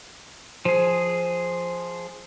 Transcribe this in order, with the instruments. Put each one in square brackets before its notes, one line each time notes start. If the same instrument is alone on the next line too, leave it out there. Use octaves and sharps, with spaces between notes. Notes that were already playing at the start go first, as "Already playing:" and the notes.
[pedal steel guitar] F3 G#4 [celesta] C5